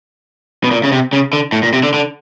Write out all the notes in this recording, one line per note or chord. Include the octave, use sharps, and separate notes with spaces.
B2
A#2
C#3
C3
C#3
D3
A2
A#2
C3
D3
D3